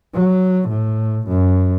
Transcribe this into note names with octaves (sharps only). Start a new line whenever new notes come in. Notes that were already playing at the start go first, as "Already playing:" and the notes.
F#3
A2
F#2